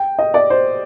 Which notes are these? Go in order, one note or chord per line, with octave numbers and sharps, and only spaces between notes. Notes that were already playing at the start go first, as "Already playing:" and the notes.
Already playing: G5
D#5
D5
C5